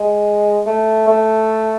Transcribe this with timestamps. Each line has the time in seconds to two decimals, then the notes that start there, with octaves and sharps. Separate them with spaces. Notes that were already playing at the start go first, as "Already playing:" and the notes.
Already playing: G#3
0.67 A3
1.08 A3